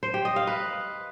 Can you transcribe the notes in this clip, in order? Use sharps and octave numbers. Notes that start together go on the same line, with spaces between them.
C5
G4
D#5
F5
B4